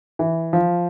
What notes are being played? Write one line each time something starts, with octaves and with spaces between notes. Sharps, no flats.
E3
F3